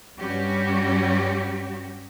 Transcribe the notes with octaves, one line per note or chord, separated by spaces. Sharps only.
G2 G3 C#4 F#4 G4